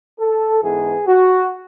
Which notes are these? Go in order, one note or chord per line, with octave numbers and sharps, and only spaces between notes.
A4
G#2 E3 B3 G#4
F#4